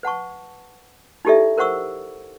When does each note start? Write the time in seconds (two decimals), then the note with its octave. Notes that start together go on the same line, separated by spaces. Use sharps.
0.03 B4 F#5 A5 C#6
1.25 D#4 E4 G4 A4 D5 E5
1.57 E4 A#4 C5 F#5 C#6 E6